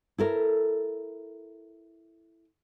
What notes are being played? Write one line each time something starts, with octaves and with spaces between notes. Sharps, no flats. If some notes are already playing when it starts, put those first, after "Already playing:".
E4 A4 A#4